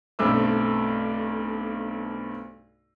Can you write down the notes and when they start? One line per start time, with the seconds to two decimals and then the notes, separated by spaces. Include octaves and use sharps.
0.19 B1 G2 A3 C4 D6 E6